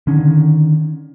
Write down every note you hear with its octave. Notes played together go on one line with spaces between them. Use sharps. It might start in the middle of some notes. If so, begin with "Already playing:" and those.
D3 D#3 C#4